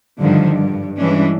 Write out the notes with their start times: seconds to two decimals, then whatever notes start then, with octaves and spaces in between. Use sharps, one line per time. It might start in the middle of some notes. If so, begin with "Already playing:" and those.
0.21 G2 D3 D#3 F3
0.52 G2
0.98 G2 E3 G#3 C#4 D4